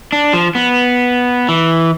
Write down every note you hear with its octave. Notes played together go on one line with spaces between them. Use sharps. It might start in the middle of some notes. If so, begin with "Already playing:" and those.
D4
F3
B3
E3